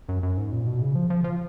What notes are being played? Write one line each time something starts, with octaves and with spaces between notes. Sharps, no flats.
F#2
F#2
G#2
A#2
B2
C#3
F3
F3
F3